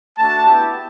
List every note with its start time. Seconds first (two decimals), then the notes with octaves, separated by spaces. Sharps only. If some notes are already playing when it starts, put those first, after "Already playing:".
0.18 A3 D4 F#4 A5
0.47 B3 E4 G4